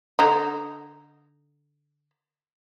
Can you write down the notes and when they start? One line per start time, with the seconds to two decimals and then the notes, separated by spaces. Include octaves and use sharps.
0.19 D3 D#4